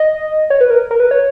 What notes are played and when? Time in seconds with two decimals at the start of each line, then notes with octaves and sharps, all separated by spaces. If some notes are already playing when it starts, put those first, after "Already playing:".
Already playing: D#5
0.50 C#5
0.61 B4
0.70 A#4
0.91 A#4
1.00 B4
1.11 C#5